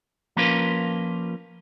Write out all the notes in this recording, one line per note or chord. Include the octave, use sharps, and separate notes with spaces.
F3 A#3 C#4 F4 A#4 B4